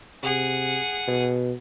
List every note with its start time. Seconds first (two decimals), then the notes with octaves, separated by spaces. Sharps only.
0.23 C3 G#4 F#5
1.07 B2